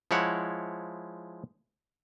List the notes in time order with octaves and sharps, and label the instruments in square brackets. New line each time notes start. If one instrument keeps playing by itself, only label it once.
[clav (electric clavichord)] F3 G#3 E4 C#5 F#5